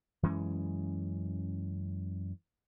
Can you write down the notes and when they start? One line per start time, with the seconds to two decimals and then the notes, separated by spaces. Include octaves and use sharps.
0.23 F#2 E3 G#3 C#4